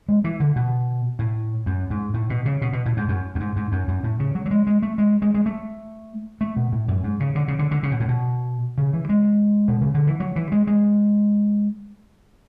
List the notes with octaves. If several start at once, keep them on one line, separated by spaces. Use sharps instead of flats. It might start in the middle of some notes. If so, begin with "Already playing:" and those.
G#3
E3
D3
B2
A2
F#2
G#2
A2
B2
C#3
B2
B2
A2
G#2
F#2
F#2
G#2
G#2
F#2
F#2
A2
C#3
F#3
F#3
G#3
G#3
A3
G#3
G#3
G#3
A3
A3
B2
A2
F#2
G#2
C#3
D3
C#3
D3
D3
C#3
B2
A2
B2
C#3
E3
G#3
B2
C#3
D3
E3
F#3
E3
G#3
G#3